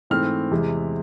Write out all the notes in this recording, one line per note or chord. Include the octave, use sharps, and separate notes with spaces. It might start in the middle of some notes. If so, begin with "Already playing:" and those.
G#2 E3 A3 C4 F6
E2 C3 G#3